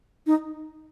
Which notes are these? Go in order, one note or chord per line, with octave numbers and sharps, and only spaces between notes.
D#4